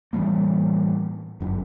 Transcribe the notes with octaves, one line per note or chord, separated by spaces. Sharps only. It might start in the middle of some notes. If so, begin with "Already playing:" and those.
A2 E3 G3 A#3
G1 F#2